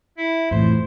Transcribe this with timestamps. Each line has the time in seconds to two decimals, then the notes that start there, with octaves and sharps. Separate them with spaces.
0.18 E4
0.51 F2 A2 E3 C5